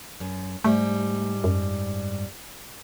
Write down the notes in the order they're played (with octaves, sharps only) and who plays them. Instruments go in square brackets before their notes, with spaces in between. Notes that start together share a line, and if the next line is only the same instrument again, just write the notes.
[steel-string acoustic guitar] F#2
[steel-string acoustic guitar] G#2 G3 [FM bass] A3
[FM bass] F#2